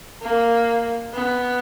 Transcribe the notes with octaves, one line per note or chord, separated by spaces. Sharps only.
A#3
B3